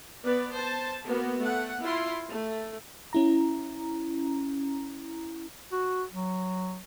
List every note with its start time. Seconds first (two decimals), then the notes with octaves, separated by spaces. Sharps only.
0.24 B3 B4 D5
0.54 C5 A5
1.05 A#3 B3 F#4
1.40 A3 F#5
1.82 E4 F4 C6
2.28 A3
3.13 C#4 E4 A#5
5.72 F#4
6.13 F#3